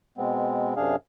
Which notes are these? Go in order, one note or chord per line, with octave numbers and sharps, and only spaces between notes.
B2 G#3 B3 C4
F#2 C3 D4 G#4 F5